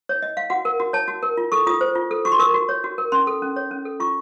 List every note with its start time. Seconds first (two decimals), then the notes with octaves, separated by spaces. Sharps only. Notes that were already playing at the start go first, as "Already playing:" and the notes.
0.09 C#5
0.22 D#5
0.37 F5
0.50 F#4 F#5
0.65 A#4
0.80 F#4
0.93 C#5 A5
1.08 F#4
1.23 A#4
1.37 F4
1.52 A4 C#6
1.67 F4 D#6
1.81 C5
1.95 F4
2.11 A4
2.25 F#4 C#6
2.32 C6
2.39 A#4 C#6
2.54 F#4
2.69 C#5
2.84 F#4
2.98 A#4
3.12 C#4 C6
3.27 A4
3.42 C#4
3.56 C#5
3.71 C#4
3.85 A4
4.00 F4 C#6